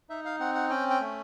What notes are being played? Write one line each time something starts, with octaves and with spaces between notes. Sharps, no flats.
D#4 E5
F5
C4 F#5
F#5
C#4 G5
G5
A3